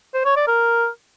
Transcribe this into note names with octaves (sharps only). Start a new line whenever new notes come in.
C5
C#5
D5
A#4